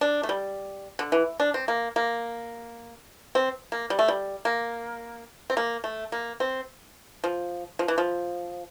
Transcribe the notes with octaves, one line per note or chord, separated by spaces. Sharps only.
D4
A3
G3
D3
E3
D4
C4
A#3
A#3
C4
A#3
G3
A3
G3
A#3
C4
A#3
A3
A#3
C4
F3
F3
E3
F3